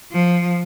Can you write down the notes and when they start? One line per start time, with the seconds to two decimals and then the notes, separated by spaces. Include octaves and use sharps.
0.13 F3